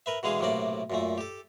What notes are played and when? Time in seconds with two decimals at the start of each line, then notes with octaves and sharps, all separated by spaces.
0.06 A#4 B4 E5
0.23 B2 D3 E3 G#3 G#4 F5
0.40 B1 A2 C3 A#3 F#4 D5
0.90 F#2 A#2 A3
1.18 G4 A4